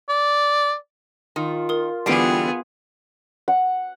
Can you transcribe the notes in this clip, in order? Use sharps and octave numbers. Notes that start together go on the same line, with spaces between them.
D5
D#3 F4
A#4 D#6
D3 E3 G3 B3 G#4 G5 C7 D7
F#5